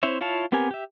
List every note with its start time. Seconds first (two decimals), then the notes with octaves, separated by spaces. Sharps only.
0.03 C4 E4 C5 C#5 E5
0.21 E4 F4 C#5 F5 A5
0.52 B3 C4 G4 A#4 G#5
0.71 G4 E5